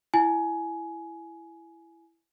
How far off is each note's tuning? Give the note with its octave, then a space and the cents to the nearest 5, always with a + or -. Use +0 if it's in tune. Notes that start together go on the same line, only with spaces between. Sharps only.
E4 +15 G#5 +15